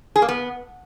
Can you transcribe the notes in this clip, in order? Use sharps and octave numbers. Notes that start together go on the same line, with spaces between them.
G#4
A#3
B3